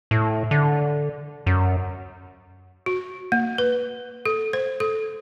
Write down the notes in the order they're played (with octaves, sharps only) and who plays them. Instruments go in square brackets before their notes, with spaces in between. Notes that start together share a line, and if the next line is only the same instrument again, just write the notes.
[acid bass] A2
D3
F#2
[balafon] F#4
A#3
B4
A4
C5
A4